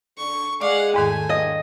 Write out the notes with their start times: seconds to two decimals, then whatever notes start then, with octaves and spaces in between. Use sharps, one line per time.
0.17 D3 C#6
0.61 G#3 D5 F5 F#5 D6
0.94 E2 G#2 D#3 A3 G#5
1.29 G2 D#5